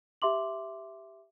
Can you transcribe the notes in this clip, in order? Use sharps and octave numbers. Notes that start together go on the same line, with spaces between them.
G4 E5 C6 D6 F#7